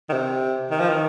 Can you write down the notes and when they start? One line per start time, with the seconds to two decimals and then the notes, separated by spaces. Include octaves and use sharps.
0.09 D#3
0.13 C3
0.71 D#3
0.80 F3
0.89 D#3